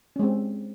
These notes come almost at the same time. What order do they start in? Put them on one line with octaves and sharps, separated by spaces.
C#4 G#3 C4